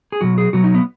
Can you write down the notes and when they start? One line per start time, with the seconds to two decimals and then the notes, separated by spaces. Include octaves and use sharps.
0.12 G#4
0.21 B2 F#3 F#4
0.38 G#4
0.53 B2 F#3 F#4
0.64 D#4
0.75 B3